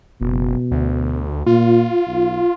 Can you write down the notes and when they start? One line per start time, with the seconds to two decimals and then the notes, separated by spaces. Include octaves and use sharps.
0.21 F#1 B2
0.71 D2
1.47 A#2 F4
2.07 B1